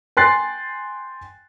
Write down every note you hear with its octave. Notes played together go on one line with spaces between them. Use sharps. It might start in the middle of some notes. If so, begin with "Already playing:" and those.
G5 G#5 C6 F#6 A6 C7